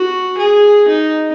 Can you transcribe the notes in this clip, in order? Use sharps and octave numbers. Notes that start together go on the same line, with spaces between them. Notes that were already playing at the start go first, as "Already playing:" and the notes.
Already playing: F#4
G#4
D#4